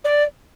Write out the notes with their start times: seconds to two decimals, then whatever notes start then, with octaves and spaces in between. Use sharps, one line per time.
0.04 D5